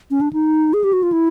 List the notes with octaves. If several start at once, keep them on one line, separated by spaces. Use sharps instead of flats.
C#4
D4
D#4
G#4
G4
F#4
F4
E4